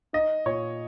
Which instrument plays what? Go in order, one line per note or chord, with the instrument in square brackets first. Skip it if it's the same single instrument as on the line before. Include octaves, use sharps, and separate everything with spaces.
[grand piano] D#4 D#5
A#2 C#5